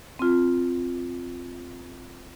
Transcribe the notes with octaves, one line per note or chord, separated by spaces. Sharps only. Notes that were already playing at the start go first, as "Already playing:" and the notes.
C4 F4